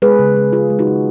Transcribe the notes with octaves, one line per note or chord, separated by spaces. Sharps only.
G#3 G#4 B4
C#3
G#3
C#3 F4 G#4
G#3
D#4 F#4
C#3